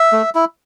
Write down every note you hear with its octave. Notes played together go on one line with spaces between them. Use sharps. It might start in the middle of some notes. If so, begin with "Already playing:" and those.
Already playing: E5
A3
E4